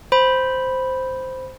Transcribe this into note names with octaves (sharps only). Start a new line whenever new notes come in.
C5 B5